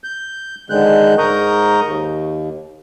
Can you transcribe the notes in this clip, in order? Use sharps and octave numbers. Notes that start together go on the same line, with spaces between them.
G6
G#2 D3 D#3 G#3 F#6 G6
G#2 A#4 A#5 C#6 D#6 G6
D#2